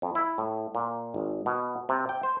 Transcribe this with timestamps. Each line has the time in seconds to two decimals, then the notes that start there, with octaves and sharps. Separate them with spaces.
0.02 F2
0.15 E4
0.38 A2
0.75 A#2
1.14 G#1
1.46 B2
1.89 C3
2.09 G5
2.23 C5